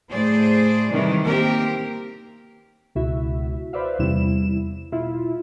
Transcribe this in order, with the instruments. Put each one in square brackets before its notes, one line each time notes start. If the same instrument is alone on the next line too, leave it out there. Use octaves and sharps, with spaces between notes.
[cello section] A2 G#4 C5 D5
C3 D#3 E3 G3 G#3
A#3 C4 G4 A#4
[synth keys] C#2 B2 E4 F#4 E5
B4 C5 D5 E5 F5
E2 C3 G3 E4 E7
B2 E4 F4